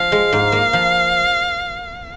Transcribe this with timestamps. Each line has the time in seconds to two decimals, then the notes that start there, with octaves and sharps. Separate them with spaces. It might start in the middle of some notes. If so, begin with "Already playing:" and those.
Already playing: F3 F5
0.12 G#3
0.33 G#2
0.52 A#3
0.73 F3